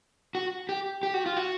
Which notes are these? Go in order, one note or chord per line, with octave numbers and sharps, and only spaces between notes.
F#4
G4
G4
F#4
F4
F#4